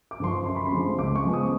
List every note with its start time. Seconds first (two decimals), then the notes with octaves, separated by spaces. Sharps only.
0.11 D6
0.20 G2 D3 F3 C6
0.28 C#6
0.45 F#2 C6
0.56 B5
0.66 C6
0.72 D3 F3 G#3 C4
0.98 C#2 D6
1.16 C#6
1.25 C#3 F3 G#3 B3
1.33 D#6